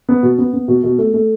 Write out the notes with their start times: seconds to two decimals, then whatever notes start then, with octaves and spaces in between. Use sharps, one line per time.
0.09 B3
0.23 B2
0.38 B3
0.53 B3
0.68 B2
0.83 B2
0.98 A3
1.14 A3